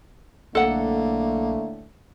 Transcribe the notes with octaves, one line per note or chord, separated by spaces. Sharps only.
B1 A2 D3 A3 A#3 A4 F#5